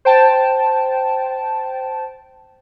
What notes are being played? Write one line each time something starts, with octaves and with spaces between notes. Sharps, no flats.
C5 G5 A5